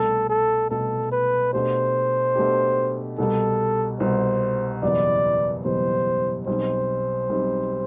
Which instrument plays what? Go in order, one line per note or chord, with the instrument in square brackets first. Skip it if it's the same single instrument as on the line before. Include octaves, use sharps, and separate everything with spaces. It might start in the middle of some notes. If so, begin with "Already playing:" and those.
Already playing: [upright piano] C2 B2 A3 [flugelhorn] A4
[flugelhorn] A4
[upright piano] C2 B2 A3 [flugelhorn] A4
[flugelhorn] B4
[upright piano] B2 A3 D4 G4 [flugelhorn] C5
[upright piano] B2 A3 D4 G4
[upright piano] C2 B2 G3 [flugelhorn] A4
[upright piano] C2 B2 G3 [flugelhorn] C5
[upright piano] F#1 E2 B2 G3 B3 [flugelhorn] D5
[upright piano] F#1 E2 B2 G3 B3 [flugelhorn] C5
[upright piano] B1 B2 G3 C4 [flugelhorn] C5
[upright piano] B1 B2 G3 C4